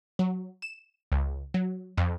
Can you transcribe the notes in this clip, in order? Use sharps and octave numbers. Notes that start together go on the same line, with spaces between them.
F#3
E7
C#2
F#3
F2